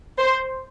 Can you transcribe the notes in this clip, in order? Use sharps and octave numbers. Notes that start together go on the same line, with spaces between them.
C5